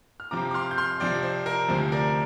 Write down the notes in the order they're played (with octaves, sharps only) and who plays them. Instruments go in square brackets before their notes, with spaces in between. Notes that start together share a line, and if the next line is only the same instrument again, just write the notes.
[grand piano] F6
C3 F3 C4 A#5 D6
D6
C6 F6
G6
C6 F6
C3 F3 C4 D5 G5
C5
A#4
D2 C3 F3 C5
A#4 D5